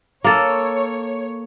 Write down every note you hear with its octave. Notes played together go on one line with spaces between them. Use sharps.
A#3 A4 C#5